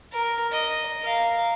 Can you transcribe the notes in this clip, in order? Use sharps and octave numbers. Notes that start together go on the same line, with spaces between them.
A#4
D#5
A#4 F5